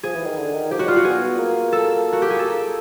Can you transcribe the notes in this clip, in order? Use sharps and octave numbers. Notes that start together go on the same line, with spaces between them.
F3 G#4
E3
D#3
D3
D#3
F3 G4
F#3 F#4
G3 F4
F#4
B3 G#4
A#3
A4
F#4
G4
G#4
A4